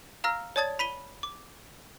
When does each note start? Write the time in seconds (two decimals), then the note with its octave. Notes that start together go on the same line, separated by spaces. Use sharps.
0.24 F5 A#5 E6 F6 A#6
0.56 C#5 D5 A5 D#6 G#6 A6
0.79 B5 B6 D#7 G7
1.23 D6